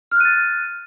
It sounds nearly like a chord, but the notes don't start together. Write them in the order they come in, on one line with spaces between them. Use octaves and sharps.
F6 F#6 D#7 A6